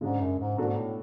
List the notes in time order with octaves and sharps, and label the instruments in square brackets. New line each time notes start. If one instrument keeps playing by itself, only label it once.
[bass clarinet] G#2 [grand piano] C#3 G#3 D4
[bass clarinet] F#2
G#2
[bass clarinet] G#2 [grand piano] B2 A3 D4 F#4 A4
[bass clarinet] A2